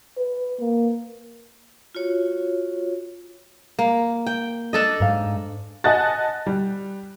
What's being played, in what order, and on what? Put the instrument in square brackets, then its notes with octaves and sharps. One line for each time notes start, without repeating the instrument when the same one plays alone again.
[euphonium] B4
A#3
[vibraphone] F4 F#4 C#5
[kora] A#3
G5
D4 A4 D#5
[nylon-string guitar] G#2 F5
[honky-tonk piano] D#5 F#5 G#5 A5 F#6 A6
G3